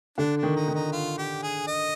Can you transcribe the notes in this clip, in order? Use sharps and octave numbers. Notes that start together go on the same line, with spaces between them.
D3 D4
D4
D#3
D#4
D#3
D#4
F4
G4
G#4
D#5